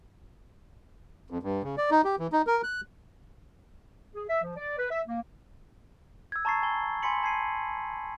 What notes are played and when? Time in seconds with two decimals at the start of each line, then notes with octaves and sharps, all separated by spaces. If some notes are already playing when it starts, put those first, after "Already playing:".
1.30 F2
1.43 G2
1.63 C#3
1.78 D5
1.91 D#4
2.04 G4
2.19 E3
2.33 D#4
2.47 A#4
2.63 F#6
4.15 G#4
4.28 E5
4.43 F3
4.57 D5
4.78 B4
4.91 E5
5.08 A#3
6.32 E6 G#6
6.45 A5 A#5 C#6 A6 C7
6.62 G#5 B5 G7
7.02 G#5 B5 C6 B6 C#7 F#7
7.23 A5 G#6 C7 D#7